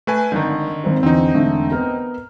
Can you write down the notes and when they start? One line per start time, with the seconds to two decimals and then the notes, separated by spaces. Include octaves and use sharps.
0.07 A3 B4 G#5
0.32 G#1 D3 D#3 G6
0.84 G#1 C4 A#4
1.03 E2 D3 C4 D#4
1.34 E1 D3 A3
1.71 B3 A#4 F6